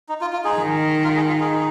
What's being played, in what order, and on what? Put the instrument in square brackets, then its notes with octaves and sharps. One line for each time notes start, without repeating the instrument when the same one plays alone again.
[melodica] D#4
F4
F4
D#4 G#4
[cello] D#3
[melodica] F4 A#4
D#4 G#4
F4
D#4 G#4